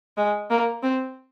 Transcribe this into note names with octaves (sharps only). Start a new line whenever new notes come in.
G#3
A#3
C4